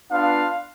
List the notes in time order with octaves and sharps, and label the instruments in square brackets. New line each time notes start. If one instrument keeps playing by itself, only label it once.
[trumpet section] B3 D4 F4 F5